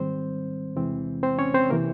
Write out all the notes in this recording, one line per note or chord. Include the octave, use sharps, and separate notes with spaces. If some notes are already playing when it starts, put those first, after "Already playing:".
Already playing: G#2 D#3 G3 C4 C5
E2 C3 E3 G#3 C4
C4 C5
C#4 C#5
C4 C5
C3 E3 A#3 A#4